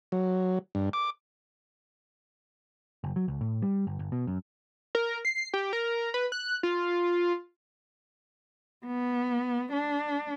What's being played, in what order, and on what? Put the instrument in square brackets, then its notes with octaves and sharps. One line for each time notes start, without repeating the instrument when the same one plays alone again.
[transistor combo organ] F#3
G2
D6
[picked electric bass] F#1
F#3
C#2
A2
G3
G1
G1
B2
F#2
[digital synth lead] A#4
C7
G4
A#4
B4
F#6
F4
[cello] B3
D4